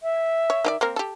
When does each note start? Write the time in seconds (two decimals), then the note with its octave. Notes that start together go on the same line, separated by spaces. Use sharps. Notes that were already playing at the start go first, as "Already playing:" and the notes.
0.02 E5
0.50 C#5
0.65 D#3 G4 D5
0.81 A#3 C4 A#4
0.96 G4 A4